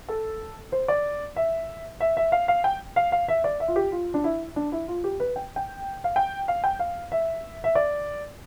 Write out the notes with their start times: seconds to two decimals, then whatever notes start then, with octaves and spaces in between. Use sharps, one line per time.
0.09 A4
0.72 C5
0.88 D5
1.36 E5
2.00 E5
2.17 E5
2.32 F5
2.48 F5
2.64 G5
2.96 F5
3.12 F5
3.28 E5
3.44 D5
3.60 E5
3.68 F4
3.76 G4
3.92 F4
4.14 D4
4.24 E4
4.56 D4
4.72 E4
4.88 F4
5.04 G4
5.20 B4
5.36 G5
5.56 G5
6.04 F5
6.16 G5
6.48 F5
6.64 G5
6.79 F5
7.12 E5
7.64 E5
7.75 D5